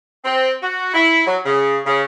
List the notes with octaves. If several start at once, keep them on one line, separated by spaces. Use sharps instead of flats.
C4
F#4
E4
F#3
C#3
C#3